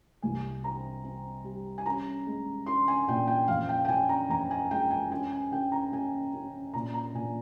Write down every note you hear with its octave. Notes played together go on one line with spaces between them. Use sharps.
C2 G#5
C4 A#5
C4
G3
G#5
C#4 A#5
G#3
C#4 C6
G#5
A#2 G5
G5
F2 F5
G5
G5
C#4 G#5
A#5
F2 A#5
G#5
G#3 G5
G#5
C#4 G#5
G#5
C#4 G5
A#5
C#4 G#5
C#4
A#2 A#5
A#5
A#2 G#5